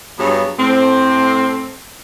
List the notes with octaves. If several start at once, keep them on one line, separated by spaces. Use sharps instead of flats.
G2 F#3 B3 G#4 C#5
A2 A3 C4